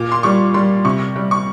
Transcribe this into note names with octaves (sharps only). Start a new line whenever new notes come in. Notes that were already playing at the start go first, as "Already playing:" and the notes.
Already playing: A#2 D6
C6
G3 C#6
G3 C6
C3 C#6
G3
C#6